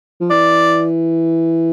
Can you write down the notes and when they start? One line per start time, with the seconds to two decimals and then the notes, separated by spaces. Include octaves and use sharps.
0.21 F3
0.30 E3 D5